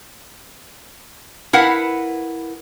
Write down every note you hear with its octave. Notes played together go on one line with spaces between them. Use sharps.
E4 A#4 B4 F5 F#5